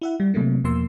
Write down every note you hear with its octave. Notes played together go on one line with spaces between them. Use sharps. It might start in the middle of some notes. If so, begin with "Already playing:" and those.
E4 E5 F#5
G3
C3 F#3 A3 A#3
E2 B2 F3 A#3 C6 E6